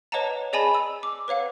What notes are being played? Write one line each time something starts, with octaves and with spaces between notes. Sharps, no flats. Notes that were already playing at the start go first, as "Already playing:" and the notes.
B4 C#5 D#5 F#5 A5 A#5
G#4 D5 D#5 G#5 A5 B5
E6
D6
B4 C#5 F5 F#5